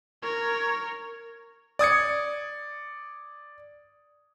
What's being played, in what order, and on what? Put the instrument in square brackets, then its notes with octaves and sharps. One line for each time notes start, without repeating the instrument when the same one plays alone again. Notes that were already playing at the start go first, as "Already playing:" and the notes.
[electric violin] A#4 C#5
[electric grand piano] D5 D#6 G#6 C#7